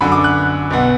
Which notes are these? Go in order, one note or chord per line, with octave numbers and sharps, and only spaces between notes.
F#2 D3 F#3 B5
D6
F#6
B1 B2 B3